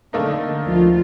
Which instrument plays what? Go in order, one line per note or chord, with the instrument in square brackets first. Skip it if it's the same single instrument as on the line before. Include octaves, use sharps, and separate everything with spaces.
[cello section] D3 [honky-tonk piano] A3 A#3 D#4
[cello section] D2 F3 F4